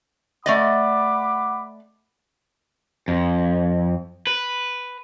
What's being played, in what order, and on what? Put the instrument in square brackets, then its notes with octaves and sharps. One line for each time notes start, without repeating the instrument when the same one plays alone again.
[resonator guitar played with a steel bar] A3 D5 D#5 [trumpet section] F#5 B5 D6
[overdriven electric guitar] F2
B4